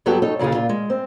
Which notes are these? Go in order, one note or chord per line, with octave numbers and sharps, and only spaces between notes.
G2 F#3 B3 F#4 G4 A4
D#4 A4 C#5
D#2 A#2 C#3 F4 G#4
A#2 F4
G#3
C4